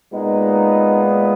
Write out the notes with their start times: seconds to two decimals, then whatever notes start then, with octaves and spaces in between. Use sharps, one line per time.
0.12 A#2 G#3 B3 D#4